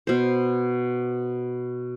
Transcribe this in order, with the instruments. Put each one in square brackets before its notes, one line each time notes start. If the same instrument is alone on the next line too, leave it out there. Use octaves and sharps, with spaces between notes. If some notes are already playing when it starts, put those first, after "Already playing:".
[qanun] B2 C5